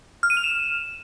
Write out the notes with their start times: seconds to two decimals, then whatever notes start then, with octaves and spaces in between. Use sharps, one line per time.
0.23 F6
0.30 D#7
0.37 F7
0.44 E7